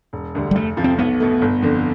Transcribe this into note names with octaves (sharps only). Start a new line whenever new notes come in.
E1
D2 D3 G3
G3
F1 A3
F2 C3 F3
C4
B1 B3
B2 A3
G1
F2 D3